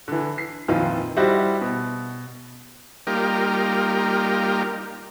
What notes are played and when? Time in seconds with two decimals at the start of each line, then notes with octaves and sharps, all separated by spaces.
0.08 D3 E3
0.38 C7
0.68 F2 A#2 D#3 E3 D#4 F4
1.16 G3 E4 F#4 G4 C5 D#5
1.61 B2
3.07 G3 A#3 D#4 F4 G4 A#4